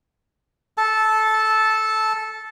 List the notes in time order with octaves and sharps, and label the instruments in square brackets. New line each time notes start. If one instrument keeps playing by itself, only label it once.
[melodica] A4 A5